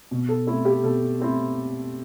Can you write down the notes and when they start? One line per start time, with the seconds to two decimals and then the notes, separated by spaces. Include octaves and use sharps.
0.11 B2
0.29 A4
0.47 A3 C4 E4
0.65 G4
0.83 B2 A4
1.20 A3 C4 E4